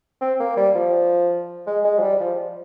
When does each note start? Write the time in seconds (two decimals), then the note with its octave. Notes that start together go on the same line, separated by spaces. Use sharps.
0.21 C4
0.40 A#3
0.57 G3
0.75 F3
1.67 G#3
1.85 G#3
1.98 F3
2.02 G3
2.20 F3